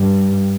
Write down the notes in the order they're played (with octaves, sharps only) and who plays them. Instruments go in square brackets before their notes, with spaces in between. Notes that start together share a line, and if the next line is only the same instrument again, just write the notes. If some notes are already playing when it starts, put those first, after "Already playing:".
Already playing: [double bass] G2